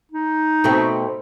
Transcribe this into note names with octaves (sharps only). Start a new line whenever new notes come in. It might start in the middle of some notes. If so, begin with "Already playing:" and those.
D#4
B2 A3 C4